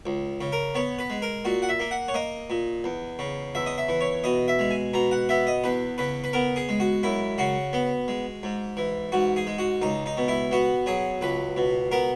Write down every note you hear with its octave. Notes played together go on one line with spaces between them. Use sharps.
C#2
C#3
A#4
B3 C#5
B4
G#3
A#4
A#2 F#4
F#5
E5
A#3
F#5
C#5
A#3 D#5
A#2
E2
C#3
E2 E5
D#5
E5
E3
C#5
B2 D#5
E5
G#3
G#5
B2 A#5
F#5
B3 E5
D#5
E2 B4
C#3 B4
B4
B3 A#4
G#4
G#3
F#4
F#2 E4
C#3 F#4
B3
G#3
G#2
E3
G#2 F#4
G#4
G#3
F#4
C#2 D#4
D#4
B2
E4
B3 F#4
F#3 G#4
C#2 B4
B2
B3 A#4